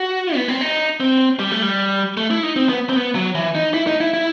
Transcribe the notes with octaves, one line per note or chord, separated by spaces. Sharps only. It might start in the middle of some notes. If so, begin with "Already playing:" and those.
Already playing: F#4
B3
C4
D#4
C4
G3
A3
G3
A3
E4
D#4
C4
B3
C4
B3
F#3
E3
D#4
E4
D#4
E4
E4